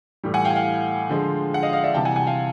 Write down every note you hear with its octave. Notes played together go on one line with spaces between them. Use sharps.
A2 E3 G3
F#5 G#5
F5 G5
G#5
F5 G5
D3 F3 G#3
F#5
D#5 F5
D#5 F5
D5 E5
C3 E3 G3 G5 A5
F#5 G#5
F#5 G#5
F5 G5